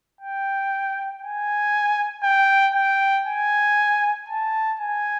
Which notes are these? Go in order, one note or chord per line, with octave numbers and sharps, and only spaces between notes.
G5
G#5
G5
G5
G#5
A5
G#5